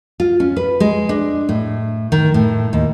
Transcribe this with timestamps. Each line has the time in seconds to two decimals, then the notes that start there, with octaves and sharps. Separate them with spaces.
0.20 F4
0.40 C#4
0.56 B4
0.80 G#3
1.09 D4
1.49 A2
2.12 D#3
2.34 A2
2.73 D#2